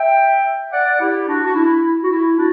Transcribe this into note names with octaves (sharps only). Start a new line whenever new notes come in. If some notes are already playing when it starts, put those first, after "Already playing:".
Already playing: E5 G5
D5 F#5
E4 G4
D4 F#4
F#4
E4
F#4
E4
D4 F#4